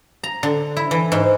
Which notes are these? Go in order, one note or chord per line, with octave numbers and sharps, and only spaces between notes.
A#5
D3
E4
E3
G#2